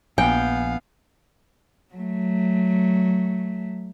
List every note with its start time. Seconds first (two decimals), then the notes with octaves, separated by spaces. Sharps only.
0.18 A#1 B3 F5 G5 G#5
1.95 F#3 A3